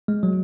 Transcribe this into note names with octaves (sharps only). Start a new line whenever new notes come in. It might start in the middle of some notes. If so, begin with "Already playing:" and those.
G#3
F#3